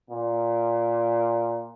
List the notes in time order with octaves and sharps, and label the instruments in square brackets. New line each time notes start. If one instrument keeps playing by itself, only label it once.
[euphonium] A#2